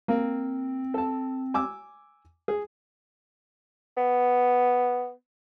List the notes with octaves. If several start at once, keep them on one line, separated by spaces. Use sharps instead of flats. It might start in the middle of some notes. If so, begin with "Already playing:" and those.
A#3 C4
A4 A5
G#5 D6 E6
G#4
B3